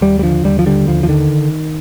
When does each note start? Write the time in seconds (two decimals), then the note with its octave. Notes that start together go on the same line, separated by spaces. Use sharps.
0.01 D#2 G3
0.19 G3
0.23 D3 F3
0.45 D#2 G3
0.59 F3
0.66 D3 G3
0.87 D#2 F3
1.03 F3
1.09 D3 D#3